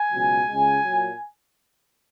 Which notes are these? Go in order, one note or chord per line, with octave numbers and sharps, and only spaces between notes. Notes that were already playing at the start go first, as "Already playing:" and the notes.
Already playing: G#5
C#2 B2 F#3
C#2 C#3 G#3
A#2 F#3